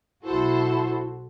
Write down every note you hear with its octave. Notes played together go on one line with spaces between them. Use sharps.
B1 E4 F#4 A4 C5